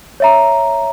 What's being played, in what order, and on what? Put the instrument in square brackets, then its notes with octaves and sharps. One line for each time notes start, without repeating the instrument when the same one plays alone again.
[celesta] C#5 E5 A#5